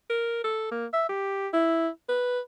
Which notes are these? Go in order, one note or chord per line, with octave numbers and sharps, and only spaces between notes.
A#4
A4
A#3
E5
G4
E4
B4